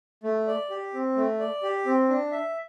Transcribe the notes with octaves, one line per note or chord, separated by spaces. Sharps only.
A3
D5
G4
C4
A3
D5
G4
C4
D4
E5